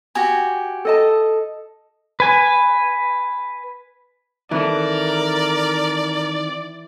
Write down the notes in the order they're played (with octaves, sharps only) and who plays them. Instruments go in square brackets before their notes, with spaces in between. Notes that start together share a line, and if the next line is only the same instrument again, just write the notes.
[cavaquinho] F#4 G4 G#5
[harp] A4 D#5 A5
[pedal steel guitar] B4 G#5
[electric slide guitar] D#3 C4 A4 [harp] E3 [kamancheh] A#4 [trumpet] D5